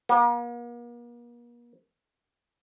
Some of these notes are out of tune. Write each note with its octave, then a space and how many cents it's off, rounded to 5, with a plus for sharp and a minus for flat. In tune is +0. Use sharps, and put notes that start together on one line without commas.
A#3 +45